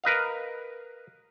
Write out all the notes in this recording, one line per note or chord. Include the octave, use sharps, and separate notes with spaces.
A#4 B4 D#5 F5